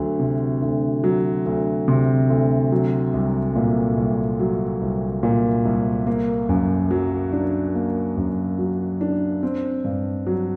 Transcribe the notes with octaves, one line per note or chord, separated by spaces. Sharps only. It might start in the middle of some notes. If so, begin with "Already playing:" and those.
Already playing: D2 F#3
C3
D2
F#3
D2
C3
D2
F#3
C2
A#2
C2
F#3
C2
A#2
C2
A#3
F#2
F#3
D4
A#3
F#2
F#3
D4
C4
G2
F#3